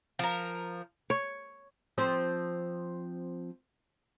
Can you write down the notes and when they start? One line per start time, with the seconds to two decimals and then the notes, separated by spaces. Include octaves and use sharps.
0.19 F3 A#4
1.10 C#5
1.98 F3 C4 C5